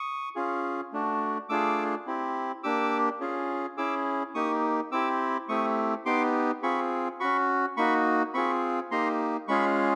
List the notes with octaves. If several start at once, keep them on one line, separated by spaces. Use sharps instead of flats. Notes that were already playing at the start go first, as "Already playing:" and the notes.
Already playing: C#6 D#6
C#4 F4 G#4
A3 D4 F#4
A3 D4 F4 G#4 D6 E6
C4 E4 G4
A#3 D4 G4 D6 E6
C#4 F4 G#4
C#4 E4 G#4 D6 E6
A#3 D#4 G4 C#6 D#6
C4 E4 G4 D6 E6
A3 C4 E4 G4 C#6 D#6
B3 D#4 G4 C6 D6
C4 F4 G#4 B5 C#6
C#4 F#4 B5 C#6
A#3 D#4 F#4 B5 C#6
C4 F4 G#4 B5 C#6
A#3 D#4 G4 A#5 C6
G#3 C#4 F4 G#4 B5 C#6